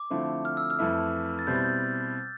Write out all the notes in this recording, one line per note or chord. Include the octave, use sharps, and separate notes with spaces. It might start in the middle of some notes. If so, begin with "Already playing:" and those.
Already playing: D6
D3 F3 A3 C4 E4
F6
E6
F6
F2 E3 A3 E4
A6
B2 G3 C4 E4 G6
A6
G6